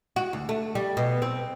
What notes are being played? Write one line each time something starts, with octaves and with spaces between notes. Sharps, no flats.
F#4
D2
A3
G3
B2
C4